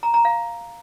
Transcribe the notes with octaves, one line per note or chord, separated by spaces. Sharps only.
A#5
A#5
F5